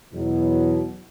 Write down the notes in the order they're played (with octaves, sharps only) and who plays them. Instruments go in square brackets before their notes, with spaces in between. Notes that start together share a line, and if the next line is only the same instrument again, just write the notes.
[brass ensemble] E2 B2 F#3